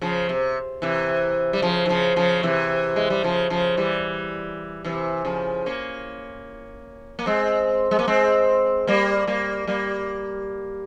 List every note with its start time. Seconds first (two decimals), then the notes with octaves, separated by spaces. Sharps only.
0.01 C#3 F3
0.29 C3
0.82 C3 E3
1.53 G3
1.62 C#3 F3
1.86 E3
1.89 C#3 F3
2.16 C#3 F3
2.43 C3 E3
2.96 G#3
3.10 G3
3.23 C#3 F3
3.50 C#3 F3
3.77 E3 G3
4.85 C3 E3
5.25 C#3 F3
5.66 A#3 C#4
7.19 A#3
7.26 G#3 C4
7.91 G#3
7.99 A#3
8.07 G#3 C4
8.87 G3 A#3
9.27 G3 A#3
9.67 G3 A#3